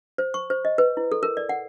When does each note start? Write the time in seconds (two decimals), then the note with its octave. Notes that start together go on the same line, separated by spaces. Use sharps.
0.18 C5
0.34 C#6
0.50 C5
0.65 D#5
0.78 B4
0.97 E4
1.12 A4
1.23 A#4
1.37 D5
1.49 F#5